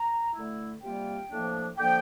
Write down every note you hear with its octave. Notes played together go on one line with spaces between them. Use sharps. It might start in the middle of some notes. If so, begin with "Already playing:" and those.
Already playing: A#5
D3 A3 E4
C3 G3 A#3 F4 G5
A2 F3 A#3 D4
D3 F3 A#3 G5